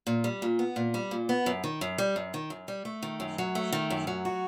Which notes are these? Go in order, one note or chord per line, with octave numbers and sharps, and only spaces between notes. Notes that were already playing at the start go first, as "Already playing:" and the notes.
A#2
G3
A#2
B3
A#2
G3
A#2
B3
F#2
D#3
F#2
G3
F#2
D#3
F#2
G3
A3
D#3
F#2
F#3
A3
D#3
F#2
F#3
F#4